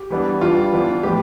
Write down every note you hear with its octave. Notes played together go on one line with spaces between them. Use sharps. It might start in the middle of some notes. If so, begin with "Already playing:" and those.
Already playing: G4
E3 G3 B3 D4
E3 G3 D4 F4
E3 B3 D4
A2 F3 B3 G4